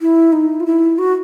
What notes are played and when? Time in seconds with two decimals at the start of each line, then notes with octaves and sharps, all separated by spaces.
0.01 E4
0.32 D#4
0.60 F4
0.66 E4
0.98 F#4